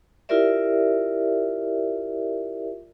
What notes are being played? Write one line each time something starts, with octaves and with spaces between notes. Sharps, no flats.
E4 F4 G4 A#4 D5 E5